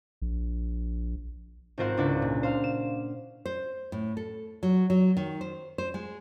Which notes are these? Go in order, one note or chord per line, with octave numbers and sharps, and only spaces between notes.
A#1
G#1 C4 F4 A#4 C5 F#5
C#2 D4 E4 F#5
A#2
C5 F5
E7
C5
A2
A4
F#3
F#3
D#3
C5
C5
G#3